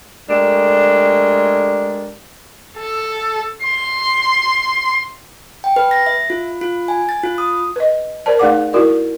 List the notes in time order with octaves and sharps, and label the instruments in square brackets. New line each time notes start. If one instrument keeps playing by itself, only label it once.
[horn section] G#3 A3 D4 G4 A#4
[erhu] A4
C6
[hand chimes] G5
B4
A#6
E5
F4
F4
G#5
A6
F4
D#6
[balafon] B4 D#5
A#4 C5 D5 A5
A3 D#4 G#4 D5 F#5 D6
E4 F#4 A#4 D5